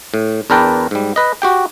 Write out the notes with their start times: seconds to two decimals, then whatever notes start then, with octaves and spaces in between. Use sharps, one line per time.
0.14 A2
0.50 E2 D4 A#4 B4 G5 A5
0.91 G#2 G3
1.16 B4 D#5
1.42 F#4 G4 G5